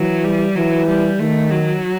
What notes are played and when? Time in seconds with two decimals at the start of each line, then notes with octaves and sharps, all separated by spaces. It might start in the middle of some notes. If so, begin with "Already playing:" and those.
Already playing: E3 F#3
0.24 G3
0.55 E3 F#3
0.87 G3
1.19 D#3 A3
1.51 F#3